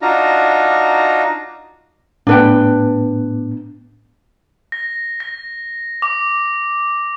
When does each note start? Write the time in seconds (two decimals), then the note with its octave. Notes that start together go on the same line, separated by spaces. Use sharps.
0.02 D4 D#4 F4 F#4 A#5
2.27 A2 B3 D4 B4 G5
4.72 A#6
5.20 A#6
6.02 D6